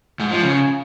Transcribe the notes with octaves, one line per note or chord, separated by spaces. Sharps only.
G#2
F3
C#3